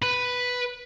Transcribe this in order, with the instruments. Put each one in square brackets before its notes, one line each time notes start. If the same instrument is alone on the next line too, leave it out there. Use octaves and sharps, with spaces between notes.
[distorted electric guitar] B4 B5